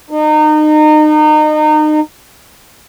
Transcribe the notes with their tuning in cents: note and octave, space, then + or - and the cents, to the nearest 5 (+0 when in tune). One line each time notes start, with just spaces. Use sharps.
D#4 -30